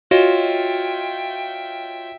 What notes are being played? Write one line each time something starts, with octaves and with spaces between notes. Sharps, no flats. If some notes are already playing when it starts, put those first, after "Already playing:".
F4 F#4 C#5 D#5 E5 G5